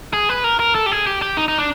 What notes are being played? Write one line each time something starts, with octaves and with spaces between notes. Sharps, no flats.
G#4
B4
A#4
A#4
A4
G4
G#4
G4
G4
D#4
D#4
D4